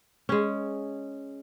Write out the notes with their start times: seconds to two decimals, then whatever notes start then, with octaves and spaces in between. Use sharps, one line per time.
0.29 G#3 C#4